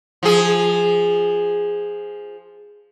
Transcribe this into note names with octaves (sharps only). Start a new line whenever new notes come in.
F3 G#4